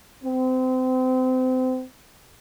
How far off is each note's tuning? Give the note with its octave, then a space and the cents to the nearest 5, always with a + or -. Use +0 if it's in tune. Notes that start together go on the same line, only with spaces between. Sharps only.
C4 -30